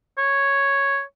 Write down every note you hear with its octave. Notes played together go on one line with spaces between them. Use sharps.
C#5